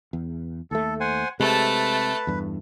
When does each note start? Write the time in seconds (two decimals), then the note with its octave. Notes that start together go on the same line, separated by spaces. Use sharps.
0.13 E2
0.71 D#2 A3 A4
1.00 C5 F#5 G#5
1.40 C3 G#3 A3 B4 A5
2.27 E2 G2